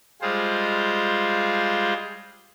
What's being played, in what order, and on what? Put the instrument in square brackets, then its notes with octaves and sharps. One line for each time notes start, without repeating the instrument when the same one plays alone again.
[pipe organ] G3 G#3 F4 G#4 C5